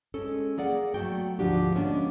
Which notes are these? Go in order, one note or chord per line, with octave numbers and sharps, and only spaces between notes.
G#3 C#4 A4
A#3 G#4 D5 F#5
F#3 A3 B3 F#4 G5
D2 G#2 F3 D4 F#4 G4
G#3 A#3 B3 C#4 D4